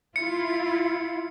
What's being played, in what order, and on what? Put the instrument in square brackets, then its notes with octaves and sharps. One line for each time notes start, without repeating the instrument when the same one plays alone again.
[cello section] E4 F4 [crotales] C#7